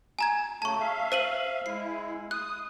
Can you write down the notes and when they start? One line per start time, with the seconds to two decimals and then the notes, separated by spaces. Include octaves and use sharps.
0.19 G#5 A#5 G#6
0.62 C#3 F#3 A3 A5 C#6
0.80 E5 F5
1.12 C5 D#7 F#7
1.66 G#3 E4 C7
2.31 D#6 F#6